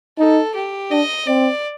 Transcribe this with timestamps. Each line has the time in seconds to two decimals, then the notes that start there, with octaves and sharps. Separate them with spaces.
0.19 D#4 A4
0.55 G4
0.91 D4 D#5
1.27 C4 D5